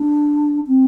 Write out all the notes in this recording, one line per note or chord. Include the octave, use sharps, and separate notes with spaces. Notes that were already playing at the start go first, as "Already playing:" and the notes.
Already playing: D4
C4